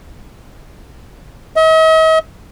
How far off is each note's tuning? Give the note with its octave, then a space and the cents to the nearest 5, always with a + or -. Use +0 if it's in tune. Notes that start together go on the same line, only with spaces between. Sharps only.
D#5 +45